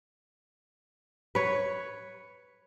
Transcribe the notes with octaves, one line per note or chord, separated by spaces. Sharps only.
B4 C#5